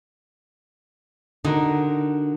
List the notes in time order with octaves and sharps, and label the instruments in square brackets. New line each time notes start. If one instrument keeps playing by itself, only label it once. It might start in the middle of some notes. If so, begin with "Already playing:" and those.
[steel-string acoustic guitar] D3 [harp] D#4 F#4 A#4